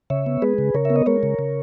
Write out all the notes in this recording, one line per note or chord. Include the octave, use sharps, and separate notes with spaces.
C#3 C#5 E5
B3
G#3 G#4 B4
C#3
C#3 A#4 C#5
B3 E5
D#5
G#3 A#4 C#5
C#3
C#3